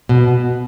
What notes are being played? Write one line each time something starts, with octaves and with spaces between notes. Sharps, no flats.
B2